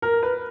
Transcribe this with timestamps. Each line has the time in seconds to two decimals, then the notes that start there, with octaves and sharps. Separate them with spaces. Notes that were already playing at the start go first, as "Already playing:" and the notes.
0.02 A#4
0.23 B4